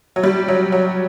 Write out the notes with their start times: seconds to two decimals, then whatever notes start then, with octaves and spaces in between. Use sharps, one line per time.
0.16 F#3
0.24 G3
0.48 F#3
0.72 F#3